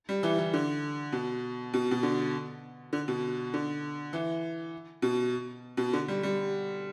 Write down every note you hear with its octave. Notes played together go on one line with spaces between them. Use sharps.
G3
E3
E3
D3
B2
B2
B2
D3
D3
B2
D3
E3
B2
B2
D3
G3
G3